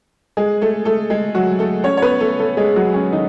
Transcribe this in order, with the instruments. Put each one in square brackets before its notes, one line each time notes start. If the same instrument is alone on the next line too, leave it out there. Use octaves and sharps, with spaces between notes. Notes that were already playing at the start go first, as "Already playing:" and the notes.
[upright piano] G#3 G#4
A3 A4
A3 A4
G#3 G#4
F#3 F#4
A3 A4
C#4 C#5
C#5
B3 B4
A3 A4
A3 A4
G#3 G#4
F#3 F#4
C#4
D#3 D#4